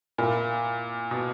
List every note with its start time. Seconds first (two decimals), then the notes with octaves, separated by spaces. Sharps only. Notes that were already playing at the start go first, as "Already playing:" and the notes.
0.18 A#2 A#3 E4 A#4
1.11 B2